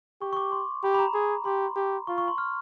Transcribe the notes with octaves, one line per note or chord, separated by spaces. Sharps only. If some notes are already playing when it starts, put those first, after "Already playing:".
G4 C#6
C#6
D6
C6
G4 B5
B5
A#5
G#4
G4 C6
G4
F4 C#6
C#6
C6
F6